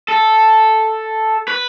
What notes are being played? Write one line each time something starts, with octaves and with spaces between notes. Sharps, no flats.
A4
B4